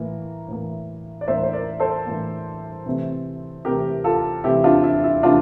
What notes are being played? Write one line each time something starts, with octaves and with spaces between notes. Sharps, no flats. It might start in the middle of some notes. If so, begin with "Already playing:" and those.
Already playing: A2 E3 A#3
A2 E3 A#3
D5
A2 E3 A#3 C5 E5
C5
A#4 D5
A4 C5
A2 E3 A#3
C3 E3 A3 C4
C3 E3 A3 C4 G4 A#4
F4 A4
C3 E3 A3 C4 E4 G4
D4 F4
E4
E4
C3 E3 A3 C4 D4 F4